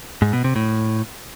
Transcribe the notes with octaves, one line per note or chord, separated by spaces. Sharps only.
G#2
B2
C3
A2